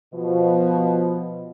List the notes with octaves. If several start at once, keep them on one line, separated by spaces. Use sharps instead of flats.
B2 F3